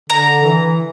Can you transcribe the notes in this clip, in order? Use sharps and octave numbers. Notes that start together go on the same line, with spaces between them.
D3 A#5
E3